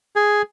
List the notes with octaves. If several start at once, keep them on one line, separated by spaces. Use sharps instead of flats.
G#4